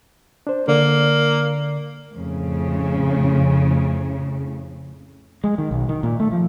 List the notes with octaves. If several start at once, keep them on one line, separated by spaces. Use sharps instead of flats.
D4 C5
D3 A#3 D5
F2 A2 C#3
G#3
D#3
B1
D#3
A#2
A3
F3